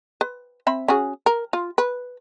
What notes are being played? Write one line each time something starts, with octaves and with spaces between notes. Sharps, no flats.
B4
C4 E5 B5
C#4 F#4 G#4
A#4
F4
B4